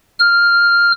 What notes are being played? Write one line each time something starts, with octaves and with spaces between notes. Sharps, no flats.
F6